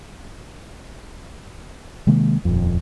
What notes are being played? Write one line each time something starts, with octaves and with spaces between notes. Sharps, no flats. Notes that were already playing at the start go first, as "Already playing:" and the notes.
C3 D#3 G#3 A#3
D#1 F2